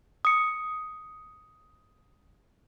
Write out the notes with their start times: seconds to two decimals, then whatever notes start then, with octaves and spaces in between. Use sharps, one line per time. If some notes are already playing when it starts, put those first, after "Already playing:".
0.25 D#6 C#7